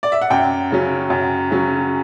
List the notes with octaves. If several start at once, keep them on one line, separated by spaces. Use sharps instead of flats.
D5
E5
F#5
F#2 G5
C#3 F#3 C#4
F#2
C#3 F#3 C#4